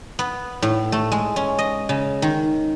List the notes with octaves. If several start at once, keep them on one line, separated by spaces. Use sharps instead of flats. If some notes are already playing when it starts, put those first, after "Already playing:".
B3
A2
A3
G#3
C#4
D#5
C#3
D#3